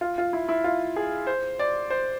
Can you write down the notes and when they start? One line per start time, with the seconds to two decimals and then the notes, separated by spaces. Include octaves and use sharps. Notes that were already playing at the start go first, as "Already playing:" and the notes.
0.01 F4
0.18 F4
0.33 E4
0.49 E4
0.64 F4
0.96 G#4
1.27 C5
1.59 D5
1.90 C5